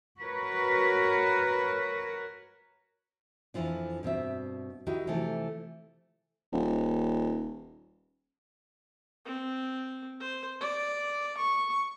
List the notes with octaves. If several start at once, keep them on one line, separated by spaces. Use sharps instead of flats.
F#4 A#4 B4 C#5
F2 B2 E3 F3 D4
G2 B2 C4 E5
D#3 D#4 E4 F#4 G4
C3 E3 F3 A3 G4
D#1
C4
C5
D5
C#6